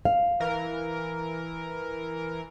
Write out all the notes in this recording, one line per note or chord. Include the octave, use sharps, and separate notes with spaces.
F5
E3 A#4